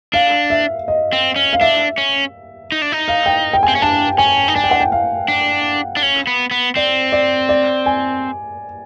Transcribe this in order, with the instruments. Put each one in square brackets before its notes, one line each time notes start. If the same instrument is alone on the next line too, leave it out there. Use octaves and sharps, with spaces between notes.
[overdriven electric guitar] D4 [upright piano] F5
[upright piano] E5
D#5
[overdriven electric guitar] C4
C#4
[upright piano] F5
[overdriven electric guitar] D4 [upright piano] E5
[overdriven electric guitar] C#4
D#4
D4
D#4
[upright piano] F5
G5
G5
G#5
[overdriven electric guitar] C4
C#4
[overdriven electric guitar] D4 [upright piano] A5
[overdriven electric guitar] C#4 [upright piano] G#5
[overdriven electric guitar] D#4
[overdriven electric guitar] D4 [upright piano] G#5
[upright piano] G5
F#5
G5
F5
[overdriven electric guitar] D4
D4
C#4
B3
B3
[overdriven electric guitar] C4 [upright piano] D5
[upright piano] D5
D5
G#5